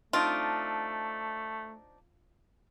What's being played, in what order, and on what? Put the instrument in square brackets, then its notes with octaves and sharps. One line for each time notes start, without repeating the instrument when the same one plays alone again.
[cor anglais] A3 [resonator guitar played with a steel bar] C4 D4 D#4 [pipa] F4